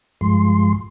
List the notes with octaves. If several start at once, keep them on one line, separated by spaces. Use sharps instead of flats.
G2 F3 G#3 C6